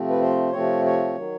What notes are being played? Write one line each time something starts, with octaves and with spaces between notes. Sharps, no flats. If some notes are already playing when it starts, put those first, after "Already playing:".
Already playing: C3 F3 A3 C4
B4
C5
C3 F3 A3 C4 C#5
C#5
D#3 F#3